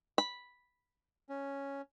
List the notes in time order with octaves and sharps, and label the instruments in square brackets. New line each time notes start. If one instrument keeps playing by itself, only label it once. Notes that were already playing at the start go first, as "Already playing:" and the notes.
[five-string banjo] B5
[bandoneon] C#4